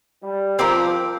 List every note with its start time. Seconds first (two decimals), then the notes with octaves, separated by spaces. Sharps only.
0.21 G3
0.59 F3 C4 G4 A#4